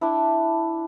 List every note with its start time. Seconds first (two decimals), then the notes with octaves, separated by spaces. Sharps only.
0.01 D4 E4